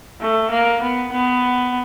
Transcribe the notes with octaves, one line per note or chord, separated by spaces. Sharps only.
A3
A#3
B3
B3